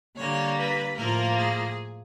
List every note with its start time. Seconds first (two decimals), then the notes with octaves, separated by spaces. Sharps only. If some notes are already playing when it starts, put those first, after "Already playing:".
0.16 D3 G3 A#3 C#5
0.56 B4
0.96 A2 F3 A#3 A#4
1.36 G#4